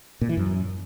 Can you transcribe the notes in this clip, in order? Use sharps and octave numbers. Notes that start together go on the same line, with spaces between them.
A#2
E3
F#2